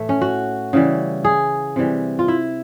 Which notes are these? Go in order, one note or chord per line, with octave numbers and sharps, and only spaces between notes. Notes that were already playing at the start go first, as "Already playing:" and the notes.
Already playing: A2 E3 A3
C#4
F#4
C#3 E3 G3
G#4
C3 E3 G3
F4
E4